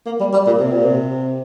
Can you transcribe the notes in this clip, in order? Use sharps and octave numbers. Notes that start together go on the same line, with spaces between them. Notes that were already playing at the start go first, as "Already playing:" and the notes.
A#3
G3
G3
A#2
C3
A#2
C3